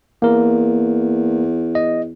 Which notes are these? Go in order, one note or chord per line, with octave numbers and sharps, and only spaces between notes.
E2 A#3 A#4
D#5